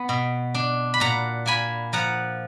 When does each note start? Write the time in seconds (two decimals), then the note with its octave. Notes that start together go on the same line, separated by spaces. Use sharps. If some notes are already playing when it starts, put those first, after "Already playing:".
Already playing: B3
0.09 B2
0.54 D4
0.94 B5
1.00 A#2 F#5 A#5
1.46 A#3 G#5 B5
1.93 F3 F#5 A#5